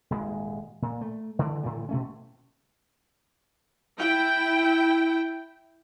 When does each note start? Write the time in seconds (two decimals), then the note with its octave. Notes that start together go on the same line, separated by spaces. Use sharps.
0.10 D#1 G#1 G#3
0.82 A#2
1.01 A3
1.39 D3 E3
1.63 A2 D3 E3 G3
1.89 B2 A3 C#4
3.98 E4 G5